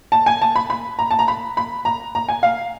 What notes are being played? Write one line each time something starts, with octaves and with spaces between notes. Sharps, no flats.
A5
G#5
A5
B5
B5
A#5
A5
A#5
B5
B5
A#5
A#5
G#5
F5